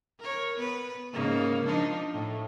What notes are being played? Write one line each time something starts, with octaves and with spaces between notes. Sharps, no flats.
A#4 C#5
B3 B4
G#2 C#3 A#3
F3 D4 D#4
A2